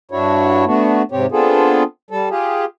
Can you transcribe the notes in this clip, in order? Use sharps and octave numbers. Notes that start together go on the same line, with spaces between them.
G2 D4 E4 F#4 C#5
A3 B3 D4 F#4
G#2 C3 C4 G4 C#5
B3 C4 D4 F4 G#4 A4
G3 A4
F4 G4 G#4